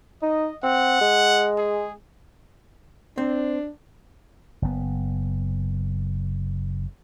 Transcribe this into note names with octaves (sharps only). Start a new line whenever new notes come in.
D#4 D#5
C4 F#5
G#3
G#4
C4 D4
F#1 B3